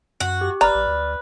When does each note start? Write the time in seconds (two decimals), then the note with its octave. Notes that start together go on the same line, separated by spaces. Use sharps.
0.20 F#2 F#4
0.41 G4
0.61 F#1 B4 D5 A#5 F6
0.75 A#1
0.87 D2